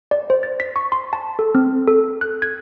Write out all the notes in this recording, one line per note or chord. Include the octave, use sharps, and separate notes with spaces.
D5
C5
A6
B6
C#6
C6
A5
A4
C4
A4
F#6
G#6